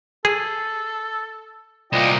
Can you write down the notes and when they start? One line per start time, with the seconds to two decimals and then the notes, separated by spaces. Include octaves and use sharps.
0.25 G#4 A4
1.93 C2 A#2 F4 D5 D#5 G5